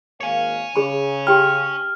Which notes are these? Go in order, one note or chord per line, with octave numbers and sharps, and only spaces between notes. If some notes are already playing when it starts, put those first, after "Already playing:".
G#1 A#3 C#5 F5 G#5
C#3 G#4 B5
G4 G5 B5 F6